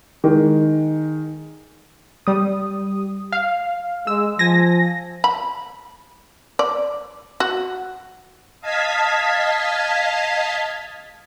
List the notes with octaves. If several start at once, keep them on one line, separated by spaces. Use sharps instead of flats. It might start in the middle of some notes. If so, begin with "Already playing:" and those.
D#3 G#3
G3 D#6
F5
G#3 E6
F3 G#5 A#6
B5
D5
F#4
D#5 F5 A5 G#6 B6